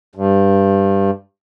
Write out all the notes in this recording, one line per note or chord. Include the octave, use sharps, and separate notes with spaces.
G2